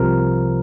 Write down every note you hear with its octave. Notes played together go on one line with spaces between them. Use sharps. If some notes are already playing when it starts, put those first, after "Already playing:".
Already playing: C2 C3 F3 A#4